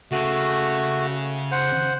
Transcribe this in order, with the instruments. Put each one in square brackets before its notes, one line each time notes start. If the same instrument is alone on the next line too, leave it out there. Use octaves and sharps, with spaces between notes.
[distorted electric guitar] C#3 [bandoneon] A3 F#4
[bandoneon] C5 F#5